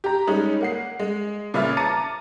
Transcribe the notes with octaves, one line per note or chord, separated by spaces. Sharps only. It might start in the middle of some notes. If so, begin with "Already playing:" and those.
G4 A#5
G3 G#3 C#4 D#4
A#3 F#5 C7
G#3
A#2 C#3 B4 E5 F6 A6
A5 A#5 D6 A6 C#7 D#7